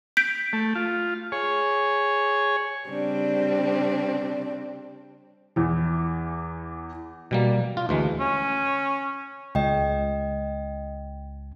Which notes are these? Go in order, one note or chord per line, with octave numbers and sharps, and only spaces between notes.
G6 B6 D7
A3
F4
G#4 C#5
C#3 G3 C4 D4
E2 E3
B2 G3 A#3
F4
D2 E3 G#3
C#4
C#2 D#5 G5